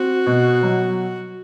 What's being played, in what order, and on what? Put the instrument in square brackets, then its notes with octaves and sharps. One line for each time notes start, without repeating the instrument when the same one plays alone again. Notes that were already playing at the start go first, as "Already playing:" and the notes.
Already playing: [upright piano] C4 [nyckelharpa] F#4
[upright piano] B2
F#3